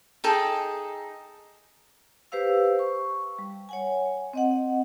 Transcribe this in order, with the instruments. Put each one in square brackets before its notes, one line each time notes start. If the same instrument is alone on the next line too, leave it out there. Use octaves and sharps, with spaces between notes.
[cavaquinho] D#4 G#4 A4 G5
[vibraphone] G4 B4 C5 F5 E6
C#6
G3
C#5 F#5 G#5
C4 D#5 F#5